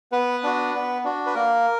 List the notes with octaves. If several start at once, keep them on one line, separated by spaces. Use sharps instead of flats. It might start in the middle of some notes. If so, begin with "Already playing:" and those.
B3 B4
D4 F#4
B3
D4 F#4
B4
A#3 A#4